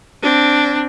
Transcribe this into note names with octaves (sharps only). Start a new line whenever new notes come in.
C4 D4